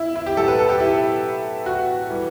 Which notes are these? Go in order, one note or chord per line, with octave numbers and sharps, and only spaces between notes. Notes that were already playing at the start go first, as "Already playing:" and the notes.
Already playing: E4
E4
G4
A2 F#3 A4
B4
A4
G4
E4
F#4
E3 G3